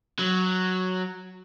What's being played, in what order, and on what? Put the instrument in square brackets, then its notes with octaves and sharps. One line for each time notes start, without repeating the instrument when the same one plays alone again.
[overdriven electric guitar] F#3